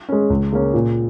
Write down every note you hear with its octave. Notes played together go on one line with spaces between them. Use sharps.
G#3 C#4
C#2
C#3 A#3 C#4
A#2